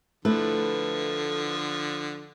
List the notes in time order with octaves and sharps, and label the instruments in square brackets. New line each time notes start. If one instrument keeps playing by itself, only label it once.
[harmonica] D3 F3 [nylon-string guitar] A3 E4 B4